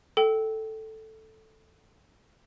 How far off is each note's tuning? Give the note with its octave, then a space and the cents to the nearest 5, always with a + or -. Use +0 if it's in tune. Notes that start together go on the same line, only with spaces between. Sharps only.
A4 +0 G5 -20